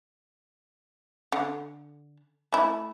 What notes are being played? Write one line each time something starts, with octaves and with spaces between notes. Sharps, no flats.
D3
A3 E4